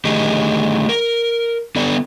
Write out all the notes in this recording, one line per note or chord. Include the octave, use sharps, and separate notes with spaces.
D3 D#3 A3 D#4 G4 G#4
A#4
D3 B3 A4 D5